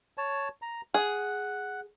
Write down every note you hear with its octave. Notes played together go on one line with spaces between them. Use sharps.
C#5 A5
A#5
G#4 F#5